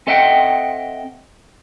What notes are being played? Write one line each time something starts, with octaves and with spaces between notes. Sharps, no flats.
C4 A4 D#5 E5 F#5 G5